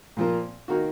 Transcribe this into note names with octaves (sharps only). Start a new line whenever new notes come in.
A#2 F3 A#3
D#3 A#3 D#4 F#4